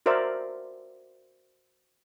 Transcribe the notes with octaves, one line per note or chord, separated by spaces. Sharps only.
F#4 A#4 C5 D5 E5